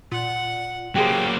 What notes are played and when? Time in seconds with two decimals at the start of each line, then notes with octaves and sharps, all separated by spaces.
0.12 A#2 F#5
0.95 F#3 A#3 G4 G#4 C5 D6